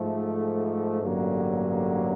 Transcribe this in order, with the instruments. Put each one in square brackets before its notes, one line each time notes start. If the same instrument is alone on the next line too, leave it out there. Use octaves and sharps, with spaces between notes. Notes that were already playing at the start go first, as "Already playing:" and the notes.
Already playing: [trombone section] G#2 F3 A3
A1 G2 D3 F#3 A#3